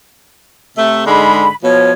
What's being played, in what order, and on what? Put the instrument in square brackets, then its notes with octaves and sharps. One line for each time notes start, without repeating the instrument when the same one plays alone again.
[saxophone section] C3 A3
[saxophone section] G#2 D3 G#3 [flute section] B5
[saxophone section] B2 F3 [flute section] C#5